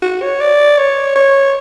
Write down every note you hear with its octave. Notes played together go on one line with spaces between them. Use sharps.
F#4
C#5
D5
C#5
C#5